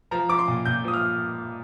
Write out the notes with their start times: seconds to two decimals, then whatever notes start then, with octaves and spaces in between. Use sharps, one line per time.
0.11 F3 A#5
0.29 F3 D6
0.39 C6
0.48 A#2
0.65 A#2 G6
0.84 F3 D#6
0.93 F6